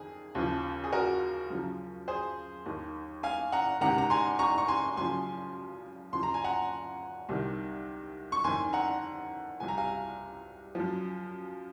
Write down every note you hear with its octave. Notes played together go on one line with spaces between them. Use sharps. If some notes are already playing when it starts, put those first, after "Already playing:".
Already playing: F2 D#3 G#4
D#2 C#3 F3
G#4
F#4 A#4
F#2 C#3 F3
G#4 C5
D#2 D#3
F5 G#5
F#5 A#5
C#2 C3 D#3 F#5 A#5
A#5
G#5 C6
A#5 C#6
C#6
G#5 C6
F#2 C#3 F3 G#5 C6
D#2 C#3 F3 C6
A#5
G#5
F#5 A#5
C2 C3 D#3
C#6
F2 D#3 G#5 C6
F#5 A#5
C2 C3 F3 G#5
A#5
F5 G#5
F#2 F3